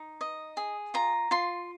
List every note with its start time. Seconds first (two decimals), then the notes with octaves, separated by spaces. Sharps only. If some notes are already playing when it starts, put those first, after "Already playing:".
Already playing: D#4
0.21 D#5
0.57 G#4
0.94 F4 A#5
1.31 F4 C6